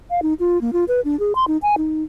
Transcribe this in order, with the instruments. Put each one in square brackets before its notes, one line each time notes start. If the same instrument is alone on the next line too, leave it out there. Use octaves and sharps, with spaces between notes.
[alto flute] F5
D#4
F4
A#3
F4
B4
D4
G#4
C6
D#4
G#5
D#4